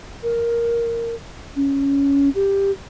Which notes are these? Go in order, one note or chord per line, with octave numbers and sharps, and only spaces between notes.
A#4
C#4
G4